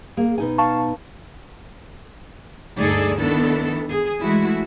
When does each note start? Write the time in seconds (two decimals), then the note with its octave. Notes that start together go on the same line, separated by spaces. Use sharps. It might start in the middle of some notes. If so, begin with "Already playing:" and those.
0.17 A#3 G#4
0.38 B2 D#4 G#5
0.58 F5 A5 C#6
2.77 D2 G2 D#4 G#4 A4 D5
3.17 D#3 B3 D4 E4 A4
3.89 G#4
4.22 E3 G#3 A3 E4 F#4